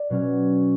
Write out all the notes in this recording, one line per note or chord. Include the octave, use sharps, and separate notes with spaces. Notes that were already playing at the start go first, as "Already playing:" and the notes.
Already playing: D5
B2 F#3 C#4